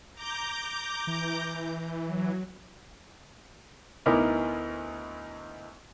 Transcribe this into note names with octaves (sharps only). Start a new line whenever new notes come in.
A#5 D6 G6
E3
F#3
D2 B3 D#4 E4 A#4 D6